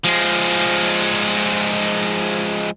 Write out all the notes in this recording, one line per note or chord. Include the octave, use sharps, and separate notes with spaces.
F3 G#3